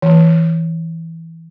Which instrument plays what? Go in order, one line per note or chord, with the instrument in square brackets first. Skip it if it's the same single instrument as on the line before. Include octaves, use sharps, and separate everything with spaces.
[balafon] E3